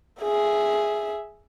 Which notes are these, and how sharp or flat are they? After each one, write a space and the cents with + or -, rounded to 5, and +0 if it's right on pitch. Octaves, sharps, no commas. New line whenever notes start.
G#4 +0 E5 +0